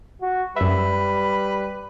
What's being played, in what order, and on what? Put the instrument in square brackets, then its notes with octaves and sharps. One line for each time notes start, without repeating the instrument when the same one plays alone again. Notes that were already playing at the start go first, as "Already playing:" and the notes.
[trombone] F#4
[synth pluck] F#2 E5 [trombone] G3 [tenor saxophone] B4